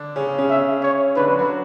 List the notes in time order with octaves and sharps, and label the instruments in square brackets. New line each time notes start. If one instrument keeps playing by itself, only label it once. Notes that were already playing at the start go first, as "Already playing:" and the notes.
Already playing: [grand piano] D3 D4
C#3 C#4
C#3 C#4
[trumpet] E5
C#5
[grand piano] D3 D4 [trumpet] B4
[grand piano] F#3 F#4
F#3 F#4